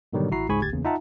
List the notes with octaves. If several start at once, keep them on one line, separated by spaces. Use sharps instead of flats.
G#2 B2 D3 D#3 F#3 G3
A1 E4 F#4 A#5 C7
C#2 G#2 G#4 G#5 B5 C#6
G1 D2 G4 G#6 A6
E2 C#3 A#3
D#4 F4 E5 F#5 A5 A#5